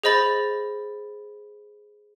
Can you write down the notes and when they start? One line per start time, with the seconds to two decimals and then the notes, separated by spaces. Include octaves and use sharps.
0.04 G#4 C5 D#5 B5 A6